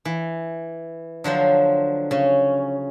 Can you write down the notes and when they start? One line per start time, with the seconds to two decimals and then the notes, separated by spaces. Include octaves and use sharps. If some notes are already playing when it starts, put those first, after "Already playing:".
0.05 E3
1.24 D3 F3 F#3 C5
2.11 C#3 C#4